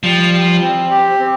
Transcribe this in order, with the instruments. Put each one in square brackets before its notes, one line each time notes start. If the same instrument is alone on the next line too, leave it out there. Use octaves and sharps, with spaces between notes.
[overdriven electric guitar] F3 [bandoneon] G3
[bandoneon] G3
C4
G4
C4